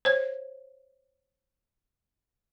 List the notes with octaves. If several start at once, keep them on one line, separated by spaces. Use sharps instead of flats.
C5 C#5